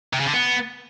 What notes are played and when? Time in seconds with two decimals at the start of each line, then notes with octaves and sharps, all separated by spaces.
0.14 C3
0.21 C#3
0.27 D3
0.34 B3